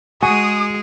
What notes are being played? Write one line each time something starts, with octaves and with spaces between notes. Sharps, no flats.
G#3 F#4 G#4 G#5 D#6